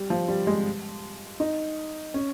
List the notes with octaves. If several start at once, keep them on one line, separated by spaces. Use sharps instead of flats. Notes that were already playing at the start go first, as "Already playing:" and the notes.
Already playing: G3
F3
G3
G#3
D#4
C#4